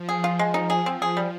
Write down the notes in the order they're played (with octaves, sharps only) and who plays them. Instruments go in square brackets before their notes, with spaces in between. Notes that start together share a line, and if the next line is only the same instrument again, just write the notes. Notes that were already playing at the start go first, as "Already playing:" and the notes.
Already playing: [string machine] F3
[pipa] G#4
F4
G#3
D#4
G#4
C4
G#4
G3